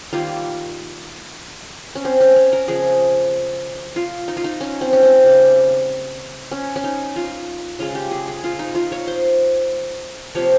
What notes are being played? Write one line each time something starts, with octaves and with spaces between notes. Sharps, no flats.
D#3 G3 A#3 F4
C#4
C4
C#4
C#4
A#4
C#3 F3 G#3 G#4
F4
D#4
F4
D#4
C#4
C4
C#4
C4
C#3 G3 A#3
C#4
C#4
D#4
F4
C#3 G#3 F4
G4
G#4
G#4
F4
D#4
F4
C#5
C5
C3 F3 A#3 C#5